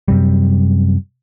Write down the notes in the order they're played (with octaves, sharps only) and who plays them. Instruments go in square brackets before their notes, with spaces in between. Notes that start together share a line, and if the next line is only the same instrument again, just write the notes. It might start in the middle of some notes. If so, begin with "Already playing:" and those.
[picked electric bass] F#2 C3 G3